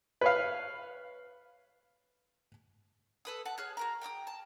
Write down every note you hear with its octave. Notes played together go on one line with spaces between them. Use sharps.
B4 C#5 F5
A4 B4 D#6
F#5 A5
G#4 C#5 F6 F#6
F#4 A#4 A#5
G5 A#5 D6 D#6
A5